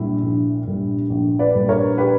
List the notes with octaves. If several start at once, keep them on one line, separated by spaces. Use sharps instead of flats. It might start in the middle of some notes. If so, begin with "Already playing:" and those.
Already playing: A#1 A#2 G3 E4
A#1
A#2 G3
A#1
B4 D5
A#2 G3
A#4 C#5
G4 B4